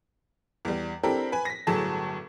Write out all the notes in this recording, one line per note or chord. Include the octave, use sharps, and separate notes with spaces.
E2 G3
C4 D4 E4 G4 A4 A#4
B4 G#5
A#6 B6
G1 A2 F#3 G#4 A5